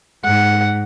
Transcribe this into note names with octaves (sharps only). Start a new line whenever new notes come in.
G#2 F#5